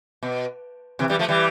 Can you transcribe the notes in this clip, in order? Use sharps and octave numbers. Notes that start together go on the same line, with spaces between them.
B2
C3 E3
E3 G3
F3 A3
E3 G3